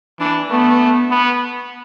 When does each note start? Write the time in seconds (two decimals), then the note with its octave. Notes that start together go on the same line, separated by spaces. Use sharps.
0.19 E3 D4
0.50 A3 B3
1.10 B3